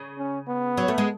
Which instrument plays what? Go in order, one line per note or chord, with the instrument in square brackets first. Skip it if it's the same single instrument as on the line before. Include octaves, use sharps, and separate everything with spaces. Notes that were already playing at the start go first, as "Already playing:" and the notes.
Already playing: [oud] C#3
[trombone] C#4
B3
[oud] F#3
A3
G#3